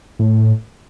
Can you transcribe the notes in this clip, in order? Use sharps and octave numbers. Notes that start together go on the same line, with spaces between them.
A2